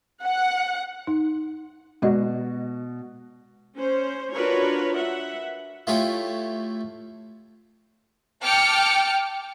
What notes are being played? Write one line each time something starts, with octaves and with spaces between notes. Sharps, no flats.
F#5
D#4
B2 G#3 F#4 D5 D#5
C#4 C5
D4 F4 F#4 A#4 B4 C#5
E5 F#5
A3 E4 F4 G4 C#5
G5 A5 D6 F6 C#7